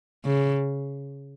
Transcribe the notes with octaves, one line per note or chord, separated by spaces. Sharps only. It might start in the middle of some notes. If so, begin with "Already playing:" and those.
C#3